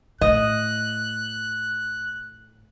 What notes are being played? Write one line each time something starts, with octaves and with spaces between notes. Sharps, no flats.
A2 D#5 F#6